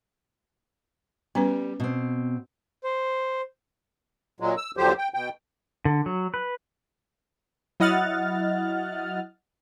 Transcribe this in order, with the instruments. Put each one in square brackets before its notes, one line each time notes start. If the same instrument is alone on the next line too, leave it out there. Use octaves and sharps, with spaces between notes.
[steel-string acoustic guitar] G3 [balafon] B3 C#4 B4
[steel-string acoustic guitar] B2 C4
[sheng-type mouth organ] C5
[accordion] A#2 F#3 G#3
E6
E2 D3 F3 F#3 G4 C5
G5
B2 G5
[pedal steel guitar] D3
F#3
B4
[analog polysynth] F#3 E4 D#5 F#5 F6 A6